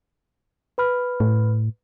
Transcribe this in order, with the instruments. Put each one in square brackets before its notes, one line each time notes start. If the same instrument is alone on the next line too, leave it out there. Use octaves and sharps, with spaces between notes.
[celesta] B4 B5 F6
[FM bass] A2